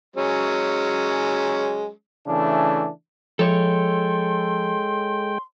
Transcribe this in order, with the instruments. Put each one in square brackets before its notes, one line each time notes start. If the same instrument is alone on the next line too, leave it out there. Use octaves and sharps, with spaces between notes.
[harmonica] F#3 G#3 C#4
[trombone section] C#3 E3 A3 D4
[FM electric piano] F3 [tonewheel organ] G#3 G5 [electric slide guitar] A4 C#5 [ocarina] C6